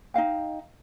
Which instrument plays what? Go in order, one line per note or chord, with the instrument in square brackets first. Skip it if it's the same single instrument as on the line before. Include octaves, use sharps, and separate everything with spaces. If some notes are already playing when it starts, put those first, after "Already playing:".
[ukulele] D#4 D#5 F5 G5